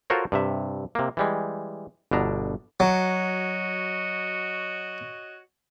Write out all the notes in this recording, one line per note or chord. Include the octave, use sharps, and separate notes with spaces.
F4 F#4 A4 A#4 C5 C#5
G2 C3 E5
C3 A#3
E3 G3 G#3
G1 B2 D4 A#5
F#3 F#4 C#5 D#5